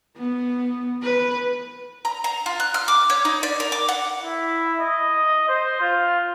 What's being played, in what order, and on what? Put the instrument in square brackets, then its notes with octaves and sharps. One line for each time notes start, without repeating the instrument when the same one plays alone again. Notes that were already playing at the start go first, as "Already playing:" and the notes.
[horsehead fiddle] B3
B4
[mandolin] A#5
A#5
F4
F#6
F6
D6
C#5
D#4
D5
A#4
D6
F#5
[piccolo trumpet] E4
D#5
C5
F4